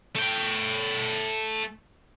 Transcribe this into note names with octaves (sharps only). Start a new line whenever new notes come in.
A3 G5